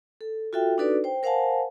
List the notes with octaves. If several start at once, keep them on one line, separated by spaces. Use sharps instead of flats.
A4
F4 F#4 A4 E5 G5
D4 D#4 F#4 A4 B4 D5
C5 G5
A#4 C5 F5 F#5 G#5 A5